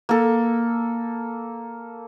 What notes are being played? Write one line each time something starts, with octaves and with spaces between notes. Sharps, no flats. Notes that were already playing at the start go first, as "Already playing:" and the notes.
A#3 A4